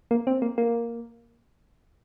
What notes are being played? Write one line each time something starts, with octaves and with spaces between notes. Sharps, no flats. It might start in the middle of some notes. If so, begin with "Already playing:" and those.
A#3
C4
A#3
A#3